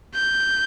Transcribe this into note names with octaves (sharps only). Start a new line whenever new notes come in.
G6